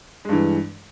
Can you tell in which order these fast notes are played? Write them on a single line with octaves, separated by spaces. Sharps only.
G#3 G2 E3